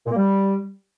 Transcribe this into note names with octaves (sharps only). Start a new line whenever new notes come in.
A#2
A#3
G3